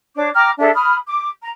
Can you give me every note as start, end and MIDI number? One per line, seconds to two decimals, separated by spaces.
0.15 0.29 62
0.15 0.29 73
0.15 0.29 86
0.34 0.50 79
0.34 0.50 82
0.34 0.50 86
0.34 0.50 89
0.58 0.69 62
0.58 0.69 68
0.58 0.69 69
0.58 0.69 76
0.74 0.94 83
0.74 0.94 87
0.74 0.94 89
1.07 1.28 86
1.41 1.49 82